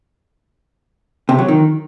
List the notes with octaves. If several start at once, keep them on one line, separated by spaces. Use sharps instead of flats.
C3
F#3
D#3